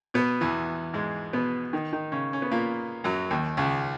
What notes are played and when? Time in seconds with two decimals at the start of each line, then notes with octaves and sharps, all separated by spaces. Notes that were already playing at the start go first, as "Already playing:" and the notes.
0.14 B2 B3
0.41 E2 E3
0.93 G#2 G#3
1.33 B2 B3
1.73 D#3 D#4
1.93 D#3 D#4
2.12 C#3 C#4
2.33 C#4
2.42 B3
2.51 A#2 A#3
3.04 F#2 F#3
3.30 D#2 D#3
3.57 C#2 C#3